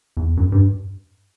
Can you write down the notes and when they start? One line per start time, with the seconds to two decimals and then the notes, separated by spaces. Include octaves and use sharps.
0.17 E2
0.37 F#2
0.52 G2